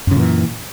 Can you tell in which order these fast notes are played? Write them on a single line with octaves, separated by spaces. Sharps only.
F#2 C#3 A#2 E3